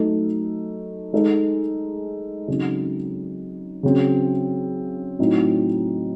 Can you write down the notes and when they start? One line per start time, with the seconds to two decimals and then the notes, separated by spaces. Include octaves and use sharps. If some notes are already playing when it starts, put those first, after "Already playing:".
Already playing: F#3 A3 D#4 A4
1.13 G#3 D#4 A4
2.48 C#3 F#3 C4 D#4
3.83 C#3 F#3 C4
5.19 A2 F#3 C4 D#4